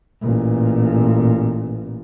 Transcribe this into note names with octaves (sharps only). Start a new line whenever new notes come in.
A1 A#2